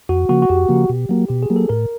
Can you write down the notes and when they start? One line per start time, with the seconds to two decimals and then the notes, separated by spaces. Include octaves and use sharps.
0.09 F2 F#4
0.29 C#3 F3 A#3 F#4
0.42 F#4
0.49 F2 G4
0.69 C#3 F3 A#3
0.89 B2
1.09 F#3 A#3
1.29 B2 G4
1.43 G#4
1.50 F#3 A#3
1.56 A4
1.69 A2 A#4